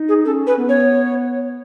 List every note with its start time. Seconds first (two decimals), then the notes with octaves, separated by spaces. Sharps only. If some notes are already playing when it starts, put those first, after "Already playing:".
Already playing: D#4
0.09 G#4
0.25 C#4 A4
0.47 C#4 B4
0.58 B3
0.69 C#5